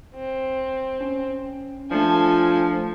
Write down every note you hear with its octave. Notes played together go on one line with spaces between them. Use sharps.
C4
C#4
F3 A3 D4 A4 G#5